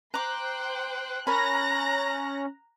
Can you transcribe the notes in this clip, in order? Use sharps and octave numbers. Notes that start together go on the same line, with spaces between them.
C5 G5 A#5 C6 D6 F#6
C#4 A#4 A#5 B5 F#6 A#6